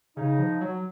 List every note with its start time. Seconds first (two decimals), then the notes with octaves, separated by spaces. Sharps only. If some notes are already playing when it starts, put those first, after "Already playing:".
0.17 C#3 D#4
0.39 F3
0.61 F#3